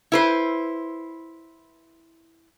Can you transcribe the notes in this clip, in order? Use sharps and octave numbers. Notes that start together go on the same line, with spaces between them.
E4 B4 C5